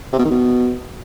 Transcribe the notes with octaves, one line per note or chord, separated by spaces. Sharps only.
C3
B2
D#3
B2